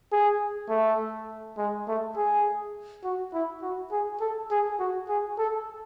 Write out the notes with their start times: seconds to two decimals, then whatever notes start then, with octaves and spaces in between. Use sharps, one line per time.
0.12 G#4
0.70 A3
1.58 G#3
1.88 A3
2.16 G#4
3.04 F#4
3.34 E4
3.62 F#4
3.92 G#4
4.21 A4
4.51 G#4
4.80 F#4
5.09 G#4
5.38 A4